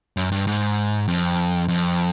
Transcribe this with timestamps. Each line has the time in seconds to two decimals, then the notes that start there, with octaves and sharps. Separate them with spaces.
0.17 F#2
0.32 G2
0.47 G#2
1.08 F2
1.68 F2